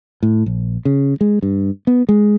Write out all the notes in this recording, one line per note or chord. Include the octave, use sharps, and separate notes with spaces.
A2
A#1
C#3
G#3
G2
B3
G#3